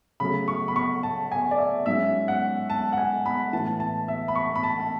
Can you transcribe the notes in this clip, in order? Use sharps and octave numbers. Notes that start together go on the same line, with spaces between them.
C#3 F#3 A3 B5
C#6
B5
C#6
A5
G#5
D5
E5
G#2 F#3 C#4 E5
F#5
A5
F#5
G#5
B5
A2 E3 B3 A5
A5
E5
B5
C#6
B5
A5
A5